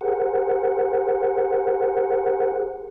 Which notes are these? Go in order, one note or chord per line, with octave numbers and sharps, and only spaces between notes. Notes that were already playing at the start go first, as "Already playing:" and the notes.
G4 G#4 A#4 C5 F#5